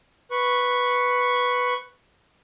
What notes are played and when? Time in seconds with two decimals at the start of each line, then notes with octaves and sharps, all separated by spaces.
0.31 B4 C#6